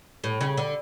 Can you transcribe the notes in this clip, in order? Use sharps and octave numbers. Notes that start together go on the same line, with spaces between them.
A2
C#3
D3